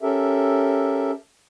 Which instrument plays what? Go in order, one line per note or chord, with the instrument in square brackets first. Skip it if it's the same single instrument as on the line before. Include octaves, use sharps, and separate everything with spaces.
[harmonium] C#4 G4 A4 A#4 E5